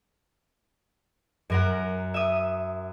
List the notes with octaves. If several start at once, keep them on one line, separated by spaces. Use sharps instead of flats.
F#2 A#4 F#5
E5 D#6